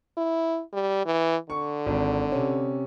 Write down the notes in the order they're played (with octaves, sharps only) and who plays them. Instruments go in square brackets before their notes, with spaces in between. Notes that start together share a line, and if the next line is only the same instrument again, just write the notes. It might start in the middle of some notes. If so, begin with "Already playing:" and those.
[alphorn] E4
G3
E3
[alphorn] D3 [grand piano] C#6
[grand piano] G#1
C3 C#4